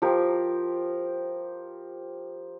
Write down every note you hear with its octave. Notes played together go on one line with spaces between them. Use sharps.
F3 G4 A#4